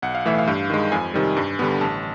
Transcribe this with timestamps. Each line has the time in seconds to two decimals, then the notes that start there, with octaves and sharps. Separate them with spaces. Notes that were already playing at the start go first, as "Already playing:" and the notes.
0.02 B1 F#5
0.15 F5
0.25 A2 E3 A3 E5
0.38 F5
0.47 G2
0.70 D#3 G#3
0.92 F2 G#5
1.14 C3 D#3 G3
1.37 G2
1.59 D3 G3 B3
1.81 A1 A5